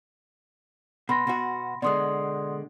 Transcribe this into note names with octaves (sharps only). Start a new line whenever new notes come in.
B2 B5 C6 A#6
B2 F#4
B2 D3 G#3 D5 C6 D#6